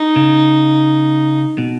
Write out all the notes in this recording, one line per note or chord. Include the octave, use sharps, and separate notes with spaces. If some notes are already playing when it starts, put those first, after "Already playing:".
Already playing: D#4
C#3
B2